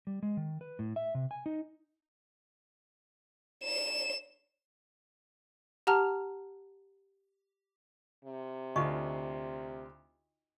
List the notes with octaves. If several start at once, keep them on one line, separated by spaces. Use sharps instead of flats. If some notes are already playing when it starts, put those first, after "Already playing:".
G3
G#3
D#3
B4
A2
E5
C3
G#5
D#4
E7
G4 F#5 A5 A#5 F6 F7
C3
D2 D#4 F4 D#5 C#6